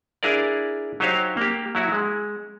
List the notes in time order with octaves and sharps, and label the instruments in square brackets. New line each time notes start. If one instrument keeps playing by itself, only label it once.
[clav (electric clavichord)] D4 E4 G#4 A#4 D5
F#3 D#4 G4 C5 C#5 F5
A#3 G4
F#3 E4 F#4
G#3